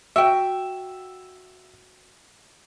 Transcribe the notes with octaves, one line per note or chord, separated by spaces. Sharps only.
F#4 E5 G5